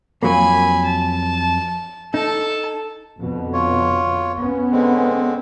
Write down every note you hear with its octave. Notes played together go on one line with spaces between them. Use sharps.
F2 F#3 A#3 G#5 B5
A5
D#4 A4 A5
F2 B2 D3
F4 C#5
B3 C#4
D3 G#3 C4